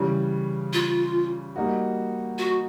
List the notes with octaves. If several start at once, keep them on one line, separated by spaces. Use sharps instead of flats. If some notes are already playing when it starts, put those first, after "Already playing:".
Already playing: C#3 E3 G3
F4
G3 A#3 D#4 F#4
F#4